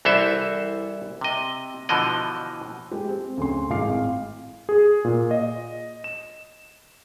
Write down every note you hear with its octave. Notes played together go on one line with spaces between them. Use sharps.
C2 E3 A4 C5 E5
C3 D#5
B2 D3 E3 F3 D#5
G#3 G4
C4
D2 C#3 C6
G#1 A2 G#3 F5 D6 C7
G#4
A#2
D#5
E7